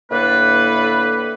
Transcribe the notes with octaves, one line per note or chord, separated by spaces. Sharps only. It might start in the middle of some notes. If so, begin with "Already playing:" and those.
A2 D3 A#3 A4 B4